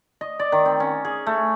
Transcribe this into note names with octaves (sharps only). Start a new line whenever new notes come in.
D#5
D5
D#3
C4
C#4
G#4
A3